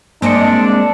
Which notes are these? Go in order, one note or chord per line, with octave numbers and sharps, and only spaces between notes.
G#3 A#3 C4 D4 D#5 C#7